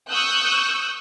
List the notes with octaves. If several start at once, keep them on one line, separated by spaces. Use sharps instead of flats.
C#6 D#6 E6 F#6 G6